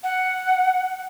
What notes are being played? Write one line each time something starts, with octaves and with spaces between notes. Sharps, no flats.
F#5